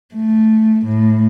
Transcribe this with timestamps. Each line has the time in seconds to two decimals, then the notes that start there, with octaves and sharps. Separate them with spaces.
0.14 A3
0.85 A2